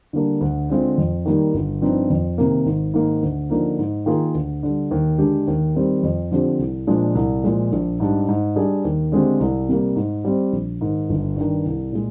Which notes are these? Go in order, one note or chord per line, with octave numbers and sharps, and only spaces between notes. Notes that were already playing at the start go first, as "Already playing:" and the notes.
D3 G3 A#3 D4
D2
D3 G#3 C4 F4
F2
D#3 G3 A#3 D#4
G1
G2 F3 C4 D#4
F2
C3 D#3 A#3
G#1
G#2 D#3 A#3
D2
D3 F3 A#3 D#4
G#2
D#3 A#3 F4 G#4
D2
D3 G3
D#2
D3 G#3 D4 G4
D#2
D#3 G3 C4
F2
D3 F3 C4 G4
C2
A#2 F3 G#3 D4
C2
A#2 F3 G#3
A#1
G#2 G3 D4
G#2
G3 D4 G#4
D#2
D3 G#3 C4 G4
C2
C3 G3 A#3
G#2
G3 C4
A#1
G#2 D#3
G1
G2 D#3
C2
A#2 G#3